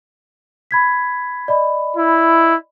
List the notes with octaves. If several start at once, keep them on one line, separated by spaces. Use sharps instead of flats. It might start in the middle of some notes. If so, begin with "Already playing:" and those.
B5 G#6 B6
D5 D#5 B5
E4